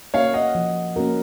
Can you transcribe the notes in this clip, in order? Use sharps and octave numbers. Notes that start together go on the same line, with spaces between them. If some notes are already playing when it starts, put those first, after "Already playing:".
A#3 C#4 F#4 A#4 C#5 F5
D#5 F#5
F3
A#3 C#4 F#4 A#4